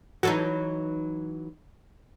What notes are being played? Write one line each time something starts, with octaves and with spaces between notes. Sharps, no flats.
E3 F#3 D#4 F#4 A4